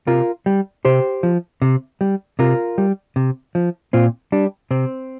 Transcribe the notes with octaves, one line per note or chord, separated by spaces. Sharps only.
C3 F4 A#4
G3
C3 G4 C5
F3
C3
G3
C3 F4 A#4
G3
C3
F3
A#2 C4 F4
G3 D4
C3 C4